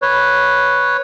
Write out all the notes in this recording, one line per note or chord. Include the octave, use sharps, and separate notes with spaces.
B4 C#5